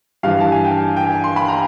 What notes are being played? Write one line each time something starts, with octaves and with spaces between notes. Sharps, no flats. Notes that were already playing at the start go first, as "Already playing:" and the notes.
G2 E3 F5
A5
G#5
G5
G5
G#5
C6
B5
A#5